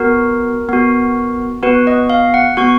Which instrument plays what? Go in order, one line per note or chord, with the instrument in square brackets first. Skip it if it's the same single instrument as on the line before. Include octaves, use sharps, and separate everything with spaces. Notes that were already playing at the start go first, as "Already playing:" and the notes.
Already playing: [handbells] B3 F#4 A#4
B3 F#4
B3 F#4 B4
D#5
F5
F#5
B3 F#4 C#6